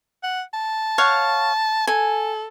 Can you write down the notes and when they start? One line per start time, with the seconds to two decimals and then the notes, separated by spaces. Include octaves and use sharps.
0.24 F#5
0.54 A5
0.98 C#5 F5 F#5
1.87 A4 G#5